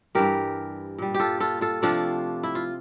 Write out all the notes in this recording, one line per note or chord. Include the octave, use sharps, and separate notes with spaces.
G2 E3 G3 G4 A#4
A#2 G3
G4
F4 A4
F4 A4
F4 A4
C3 F3 A3 D4 F4
E4
F4